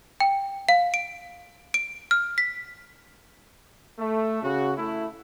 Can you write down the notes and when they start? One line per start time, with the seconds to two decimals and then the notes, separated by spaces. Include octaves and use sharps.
0.20 G5
0.69 F5
0.94 D7
1.74 D7
2.11 F6
2.38 B6
3.98 A3
4.42 C#3 F#4
4.77 A3 E4